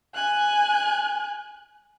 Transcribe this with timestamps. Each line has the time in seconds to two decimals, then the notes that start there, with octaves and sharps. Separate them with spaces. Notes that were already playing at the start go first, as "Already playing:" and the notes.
0.15 G#5 F#6